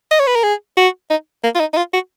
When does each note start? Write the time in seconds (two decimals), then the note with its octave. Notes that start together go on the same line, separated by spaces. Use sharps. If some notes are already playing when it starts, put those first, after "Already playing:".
0.11 D#5
0.20 C#5
0.27 B4
0.36 A#4
0.43 G#4
0.77 F#4
1.10 D#4
1.44 A#3
1.55 F4
1.60 D#4
1.73 D#4
1.77 F4
1.93 F#4